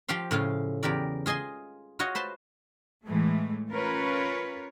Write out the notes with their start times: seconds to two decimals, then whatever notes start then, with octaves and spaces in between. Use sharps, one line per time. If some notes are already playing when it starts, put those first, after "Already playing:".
0.08 F3 F4 G4 F5 C6
0.31 A2 C#3 F4 F5
0.83 E2 C#3 G4 A#4 D5
1.26 F4 G#4 D#5 G#5 C6
1.99 F4 F#4 C#5 D#5
2.15 B4 C5 A5 C6
3.06 A2 E3 G#3 A3
3.70 C#4 F4 A#4 B4 C#5